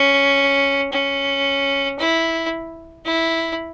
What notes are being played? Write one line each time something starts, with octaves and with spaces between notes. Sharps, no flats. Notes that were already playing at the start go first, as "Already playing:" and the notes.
Already playing: C#4
C#4
E4
E4